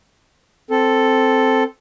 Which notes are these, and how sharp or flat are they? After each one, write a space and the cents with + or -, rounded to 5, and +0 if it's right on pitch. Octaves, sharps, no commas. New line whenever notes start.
C4 +0 A4 +0